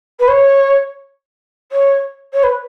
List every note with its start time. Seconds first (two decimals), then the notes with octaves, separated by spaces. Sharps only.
0.19 B4
0.28 C#5
1.72 C#5
2.33 C#5
2.43 B4